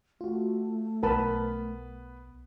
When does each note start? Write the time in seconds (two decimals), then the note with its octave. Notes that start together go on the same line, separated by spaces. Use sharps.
0.21 A3 F4 F#4
1.03 B1 B3 A#4 B4 A5 B5